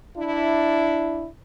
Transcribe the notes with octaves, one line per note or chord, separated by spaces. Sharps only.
D4 E4